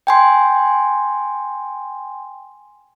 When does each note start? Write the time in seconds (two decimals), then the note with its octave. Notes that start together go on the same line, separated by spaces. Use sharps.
0.07 G5 G#5 C6